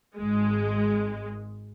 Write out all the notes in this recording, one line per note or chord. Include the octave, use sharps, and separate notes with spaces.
G#1 G#3